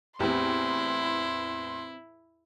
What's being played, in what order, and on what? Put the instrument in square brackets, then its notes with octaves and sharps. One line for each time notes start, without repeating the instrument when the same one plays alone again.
[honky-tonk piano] E2 A2 B3 [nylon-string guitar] C4 G4 [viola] E4 [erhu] C6